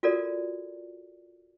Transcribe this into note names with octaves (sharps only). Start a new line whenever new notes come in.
F4 F#4 A4 A#4 D5